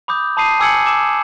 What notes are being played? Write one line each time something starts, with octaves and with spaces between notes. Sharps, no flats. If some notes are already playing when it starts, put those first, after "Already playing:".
B5 D6 D#6 G6
A5 B5 D#6 C7 D#7
G#5 D6 E6 G#6 C#7 F#7
D6 E6 E7